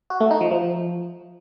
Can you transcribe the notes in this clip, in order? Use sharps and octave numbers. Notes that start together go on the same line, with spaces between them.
F#4
A3
D#4
F3
F3